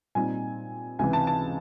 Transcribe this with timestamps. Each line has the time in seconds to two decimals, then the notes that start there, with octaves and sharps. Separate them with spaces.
0.15 A#2 G3 C4 D#4 G#5
0.99 C#2 C3 E3 G#5
1.13 A5
1.27 A5